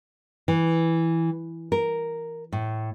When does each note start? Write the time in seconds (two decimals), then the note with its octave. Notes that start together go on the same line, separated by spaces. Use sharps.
0.48 E3
1.72 A#4
2.52 A2